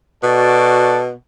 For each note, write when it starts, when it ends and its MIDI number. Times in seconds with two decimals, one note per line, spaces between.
0.23 1.12 47
0.23 0.99 66
0.23 0.99 69
0.23 0.99 74